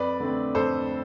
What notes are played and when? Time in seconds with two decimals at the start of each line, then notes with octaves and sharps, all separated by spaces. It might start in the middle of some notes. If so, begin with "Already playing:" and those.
Already playing: F2 B4 D5
0.20 D3 A3 C4
0.55 F2 A4 C5